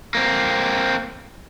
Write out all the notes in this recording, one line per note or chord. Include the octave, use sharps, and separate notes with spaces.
A#3 C4